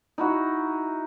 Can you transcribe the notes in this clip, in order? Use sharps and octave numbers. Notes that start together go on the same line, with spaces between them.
D#4 E4 F#4